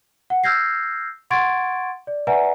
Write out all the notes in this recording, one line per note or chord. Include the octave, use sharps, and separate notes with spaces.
F#5
E6 F6 G6 G#6 A#6 C7
F#5 C6 C#6 G#6 A6 D7
D5
B4 D5 E5 F#5 G#5 A#5